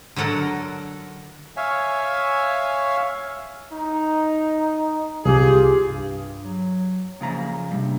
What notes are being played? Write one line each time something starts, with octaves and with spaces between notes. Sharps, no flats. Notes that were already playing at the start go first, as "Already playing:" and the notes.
D3 F#3 A4 A#4 F#5
C#5 E5 F5 G#5
D#4
C2 F4 G4 G#4
G2
F#3
C#3 F3 A#3 A#5
G2 C3